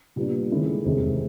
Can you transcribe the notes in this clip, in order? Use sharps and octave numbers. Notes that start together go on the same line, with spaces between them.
A#2 G3 B3 D4
D#3 G#3 C#4 E4 A4
F1 E2 C3 D#3 G#3